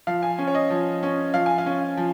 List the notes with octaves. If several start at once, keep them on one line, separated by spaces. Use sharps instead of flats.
F3 F5
G#5
C#4
C#5
D#5
F3
C#4
F3 F5
G#5
F5
C#4
F3